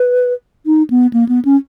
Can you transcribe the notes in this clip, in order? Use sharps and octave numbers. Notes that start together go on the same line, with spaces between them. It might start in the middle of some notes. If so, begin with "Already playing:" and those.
Already playing: B4
D#4
B3
A#3
B3
C#4